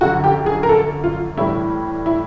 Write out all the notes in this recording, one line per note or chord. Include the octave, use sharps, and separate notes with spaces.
F#2 D3 F3 F#4
G4
G#4
A#4
A4
F4
A2 E3 G3 E4
E4